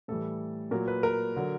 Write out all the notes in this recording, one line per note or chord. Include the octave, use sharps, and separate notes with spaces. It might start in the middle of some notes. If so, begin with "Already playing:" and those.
A2 E3 G3 A4
A#2 F#3 A#4
B4
A#4
D3 F#3